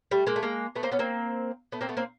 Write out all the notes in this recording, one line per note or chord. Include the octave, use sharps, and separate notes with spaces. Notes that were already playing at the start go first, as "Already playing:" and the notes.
G3 A3
G#3 A#3
A3
G#3 A#3
A3 B3
A#3 C4
B3 C#4
A#3 C4
A3 B3
A#3 C4
A3 B3
A#3 C4